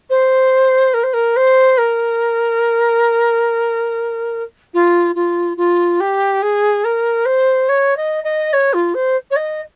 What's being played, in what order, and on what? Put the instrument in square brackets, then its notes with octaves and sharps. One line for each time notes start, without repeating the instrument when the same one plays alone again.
[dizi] C5
A#4
C5
A#4
C5
A#4
F4
F4
F4
G4
G#4
A#4
C5
C#5
D#5
D#5
C#5
F4
C5
C#5
D#5